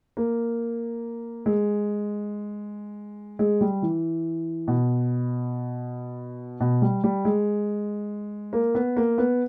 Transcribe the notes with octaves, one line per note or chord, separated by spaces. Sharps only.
A#3
G#3
G#3
G3
E3
B2
B2
G3
G3
G#3
A#3
B3
A#3
B3